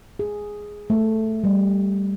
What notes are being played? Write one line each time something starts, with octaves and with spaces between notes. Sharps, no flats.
G#4
A3
G3